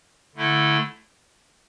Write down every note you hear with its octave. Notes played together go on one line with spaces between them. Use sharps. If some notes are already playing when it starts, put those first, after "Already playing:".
D3 A3 E4 A4